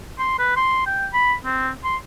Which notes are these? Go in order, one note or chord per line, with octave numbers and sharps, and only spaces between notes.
C6
B4
C6
G5
B5
C4
C6